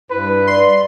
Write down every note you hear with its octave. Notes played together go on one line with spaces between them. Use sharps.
G2 E4 B4
D5 C6